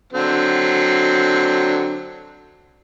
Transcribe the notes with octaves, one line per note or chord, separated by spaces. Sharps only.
D3 F#3 C4